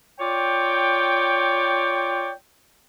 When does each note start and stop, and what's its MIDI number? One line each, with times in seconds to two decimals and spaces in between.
0.20 2.32 65
0.20 2.32 73
0.20 2.32 74
0.20 2.32 79